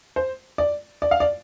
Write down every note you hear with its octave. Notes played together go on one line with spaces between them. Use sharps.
C5
D5
D5
F5
D5